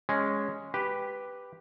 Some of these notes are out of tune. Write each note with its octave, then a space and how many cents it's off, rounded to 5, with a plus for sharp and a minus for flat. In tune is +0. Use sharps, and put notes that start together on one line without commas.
G#3 +0 C#4 +0
G4 +0 B4 +0